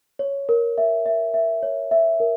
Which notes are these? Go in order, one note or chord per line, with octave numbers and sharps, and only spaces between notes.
C#5
A#4
E5
E5
E5
C#5
E5
A#4